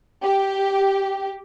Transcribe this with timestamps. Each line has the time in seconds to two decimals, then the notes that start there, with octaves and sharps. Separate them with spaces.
0.23 G4